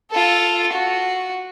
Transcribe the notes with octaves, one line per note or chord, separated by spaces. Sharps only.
F4 A4
F#4